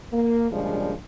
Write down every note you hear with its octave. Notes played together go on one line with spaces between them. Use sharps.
A#3
A#2 C#3 F3 G3 G#3 D4